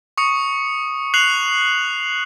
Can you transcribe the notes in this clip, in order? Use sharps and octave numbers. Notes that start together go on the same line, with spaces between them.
C#6 D#6 C#7
F#6 C7 F7 F#7